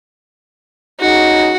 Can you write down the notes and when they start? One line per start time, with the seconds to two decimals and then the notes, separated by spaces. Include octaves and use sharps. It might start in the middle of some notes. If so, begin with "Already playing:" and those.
1.01 C#3 G#3 D#4 F#4